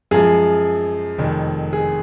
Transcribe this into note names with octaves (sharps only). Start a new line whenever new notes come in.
F#2 F3 G#3 G#4
F1 F2 D#3
G#4